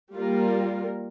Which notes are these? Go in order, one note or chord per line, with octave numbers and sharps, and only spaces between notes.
G3 A#3 F4 A#4